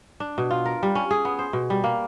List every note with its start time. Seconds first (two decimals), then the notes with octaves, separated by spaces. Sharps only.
0.20 D4
0.38 B2
0.51 F4
0.65 A#4
0.83 G3
0.95 C#4
1.11 G#4
1.25 B3
1.39 C5
1.53 B2
1.70 G3
1.84 A#3